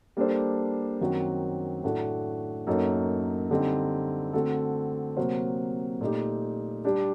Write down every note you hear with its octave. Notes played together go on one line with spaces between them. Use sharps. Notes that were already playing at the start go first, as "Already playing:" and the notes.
G3 A#3 D4 A4 C5
F#2 D#3 F#3 C4 F#4
A2 A3 D4 F#4
F#2 F#3 A#3 D#4 A4
D3 G3 C4 D#4
D3 A3 C4 F#4 A4
C3 F#3 A#3 F#4 C5
A#2 A3 D#4 G4
G3 D4 G4